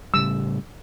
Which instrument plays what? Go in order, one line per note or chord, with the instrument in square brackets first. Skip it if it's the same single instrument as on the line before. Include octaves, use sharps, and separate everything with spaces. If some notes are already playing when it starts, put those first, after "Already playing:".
[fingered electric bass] A2 C#3 G3 [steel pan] E6